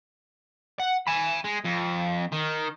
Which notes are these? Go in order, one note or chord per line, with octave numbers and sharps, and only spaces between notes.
F#5
G#5 B5
G#3
F2
D#3